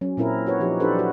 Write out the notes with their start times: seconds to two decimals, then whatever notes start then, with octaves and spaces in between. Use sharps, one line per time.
0.01 F#3 C#4
0.17 A#2 C4 E4 A#4
0.47 F#4 B4 C#5
0.60 F3 D#4 G4
0.80 D4 E4 G4 A4 B4 C5
0.94 F#3 F#4